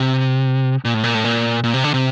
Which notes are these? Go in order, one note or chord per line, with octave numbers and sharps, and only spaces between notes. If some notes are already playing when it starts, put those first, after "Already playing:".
Already playing: C3
A#2
A2
A#2
A2
A#2
A#2
C3
D3
C3